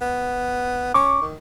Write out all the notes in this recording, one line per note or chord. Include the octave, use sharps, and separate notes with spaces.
B3
C#4 C#6 D6
D#3